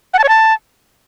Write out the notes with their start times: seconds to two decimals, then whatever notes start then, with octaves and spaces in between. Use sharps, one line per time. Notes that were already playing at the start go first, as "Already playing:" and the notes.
0.14 F#5
0.19 A5
0.24 C#5
0.29 A5